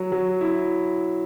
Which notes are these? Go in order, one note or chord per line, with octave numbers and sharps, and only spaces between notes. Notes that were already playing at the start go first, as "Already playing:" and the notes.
Already playing: F#3
F#3
E4